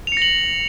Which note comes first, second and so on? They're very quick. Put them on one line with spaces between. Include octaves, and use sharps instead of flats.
F7 C#7 A#6 F#7